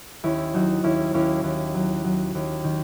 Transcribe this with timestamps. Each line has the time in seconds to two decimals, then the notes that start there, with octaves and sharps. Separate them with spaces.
0.23 D#2 C#4 E4
0.54 F#3 D#4 F#4
0.84 D#2 C#4 E4
1.14 D#2 C#4 E4
1.44 D#2
1.74 F#3
2.04 F#3
2.35 D#2
2.64 D#3